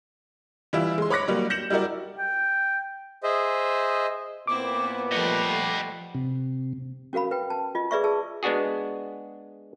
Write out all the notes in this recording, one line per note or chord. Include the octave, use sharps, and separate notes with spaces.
E3 G3 E4 F4
G#3 C6
C#5 B5 D6 F#6 A#6 C#7
F#3 G3 A#3
G6 A#6 C#7 E7 F#7
G3 E4 F#4 A#4 D5
G5
G#4 C5 D#5 E5
A#2 B3 C4 E4 D6
F3 G3 A3 D#5 F#5
C3
C#4 F#4 A#4 F5 B5
B4 G5
A5
F4 D#5
G#4 B4 D5 E5 C#6
G#4 A5 E6
G#3 B3 D4 F#4 G#4